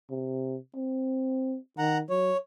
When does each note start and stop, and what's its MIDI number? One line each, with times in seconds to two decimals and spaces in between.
0.11 0.56 48
0.76 1.57 60
1.78 2.03 51
1.78 1.98 78
1.78 1.98 82
2.10 2.32 54
2.10 2.37 73